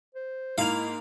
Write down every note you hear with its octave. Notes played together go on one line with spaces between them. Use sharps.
C5
G#2 A#3 E4 F5 F7